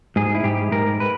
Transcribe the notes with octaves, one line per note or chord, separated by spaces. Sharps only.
G#2 G#4
E4
G#2 G4
G#2 A#4
B4